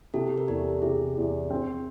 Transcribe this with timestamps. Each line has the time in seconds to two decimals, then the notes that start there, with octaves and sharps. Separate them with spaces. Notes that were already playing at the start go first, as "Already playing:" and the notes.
0.14 C3 G4 A4
0.38 A#4
0.48 E2 G4 A4
0.82 C3 G#4
1.16 E2
1.50 C4